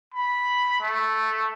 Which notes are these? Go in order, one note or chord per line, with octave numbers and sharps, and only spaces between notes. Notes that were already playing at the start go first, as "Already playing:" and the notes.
B5
A3